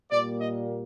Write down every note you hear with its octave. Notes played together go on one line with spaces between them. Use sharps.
A#2 G3 A#3 D5
D#5